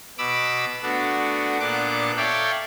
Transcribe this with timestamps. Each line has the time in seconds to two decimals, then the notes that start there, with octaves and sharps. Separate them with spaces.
0.18 B2 B5 D6 E6
0.83 A3 B3 D4 F#4
1.60 A#2 B3 D4 D6 F#6
2.16 A4 C#5 D5 E5 F5 G5